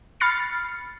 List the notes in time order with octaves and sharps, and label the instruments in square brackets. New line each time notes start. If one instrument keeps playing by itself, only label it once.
[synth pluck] B5 F6 A6 C7 C#7